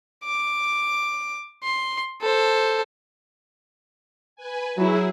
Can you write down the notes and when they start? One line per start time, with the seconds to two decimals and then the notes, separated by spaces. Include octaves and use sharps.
0.24 D6
1.63 C6
2.21 A4 C5
4.36 B4 G#5
4.77 F#3 E4 G#4